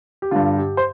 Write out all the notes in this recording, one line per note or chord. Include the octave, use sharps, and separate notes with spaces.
G4
G2 D3 F4
G4
C5